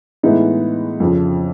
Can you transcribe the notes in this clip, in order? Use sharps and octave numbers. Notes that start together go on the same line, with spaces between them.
A2 E3 G#3 B3 D#4
F2 C#3 F3